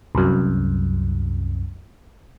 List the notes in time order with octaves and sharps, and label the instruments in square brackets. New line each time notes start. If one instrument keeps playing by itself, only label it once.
[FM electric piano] C2 F#2